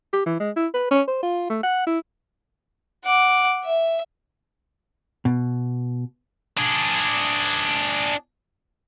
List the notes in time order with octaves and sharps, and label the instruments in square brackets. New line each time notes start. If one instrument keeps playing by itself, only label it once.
[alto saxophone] G4
E3
G#3
E4
B4
C#4
C5
F4
A3
F#5
E4
[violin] F#5 D6
E5
[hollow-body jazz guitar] B2
[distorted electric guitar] D4 G#4